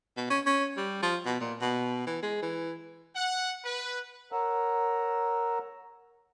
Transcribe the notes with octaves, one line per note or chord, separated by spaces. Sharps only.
B2
C#4
C#4
G3
F3
B2
A#2
B2
E3
G#3
E3
F#5
B4
A#4 C#5 F#5 A#5 E6